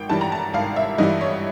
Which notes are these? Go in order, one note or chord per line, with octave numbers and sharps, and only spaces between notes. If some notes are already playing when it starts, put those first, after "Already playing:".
Already playing: G#1 G5
G2 E3 G3 A5
A#5
A5
G#1 F5
E5
G2 E3 G3 D#5
C#5